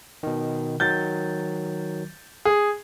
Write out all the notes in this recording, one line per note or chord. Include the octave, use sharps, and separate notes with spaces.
B2 D#3
D#3 F#3 G6 A6
G#4